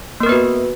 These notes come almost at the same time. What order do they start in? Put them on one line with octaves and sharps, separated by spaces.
A#3 A#4 B3 B4 F#4